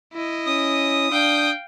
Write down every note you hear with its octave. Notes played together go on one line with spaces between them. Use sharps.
E4 D#5
C#4 D#6
D4 F5 G5 G6